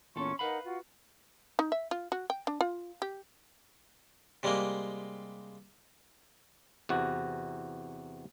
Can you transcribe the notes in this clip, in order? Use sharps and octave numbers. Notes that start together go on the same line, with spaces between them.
E2 A#2 C#4 A4 C6 C#6
D#4 A#4 B4 F5 F#5 B5
F4 F#4
D#4
E5
F4
F#4
G5
D4
F4
G4
C3 G3 G#3 A#3
E2 C3 F#4